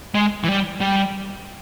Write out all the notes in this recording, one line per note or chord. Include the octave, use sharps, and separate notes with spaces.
G#3
E3
G3
G3